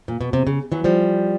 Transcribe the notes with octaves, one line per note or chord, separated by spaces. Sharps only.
A#2
B2
C3
C#3
E3 F#3
F3 G3